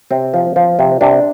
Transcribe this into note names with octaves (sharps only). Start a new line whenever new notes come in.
C3 C4
F3
F3
C3
C3 D4